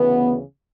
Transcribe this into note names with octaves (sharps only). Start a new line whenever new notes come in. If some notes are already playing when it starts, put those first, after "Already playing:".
Already playing: D2 C#3 E3 B3